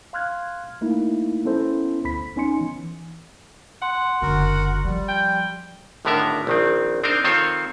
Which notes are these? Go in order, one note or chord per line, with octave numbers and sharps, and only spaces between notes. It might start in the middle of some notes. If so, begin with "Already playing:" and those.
F5 C6 F6 F#6 G#6
A3 A#3 D#4 E4
B3 C#4 E4 A4 C5
D2 B5 B6
B3 C#4 D#4 G#5 C6 C#7
E3
F#5 C6
F#1 D3 F#4 A#4
F3 G3
G5
G#1 A2 D3 B3 A#4 E5
A#1 D#3 C4
C4 D4 D#4 A#4 C5
D#3 C4 F4 A4 C5 C#5